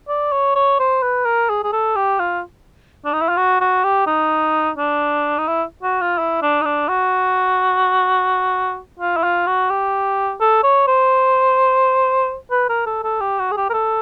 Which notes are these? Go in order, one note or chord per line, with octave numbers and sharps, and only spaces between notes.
D5
C#5
C#5
C5
B4
A#4
G#4
G#4
A4
G4
F4
D4
D#4
E4
F4
F#4
F#4
G4
D#4
D4
D#4
E4
F#4
F4
E4
D4
D#4
D4
F#4
F4
E4
F4
F#4
G4
A4
C#5
C5
B4
A#4
A4
A4
G4
F#4
G#4
G4
A#4
A4